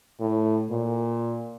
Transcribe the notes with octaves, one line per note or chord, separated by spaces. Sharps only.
A2
A#2